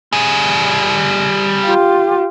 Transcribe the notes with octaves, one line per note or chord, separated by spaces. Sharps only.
G3 G#4
F4 G4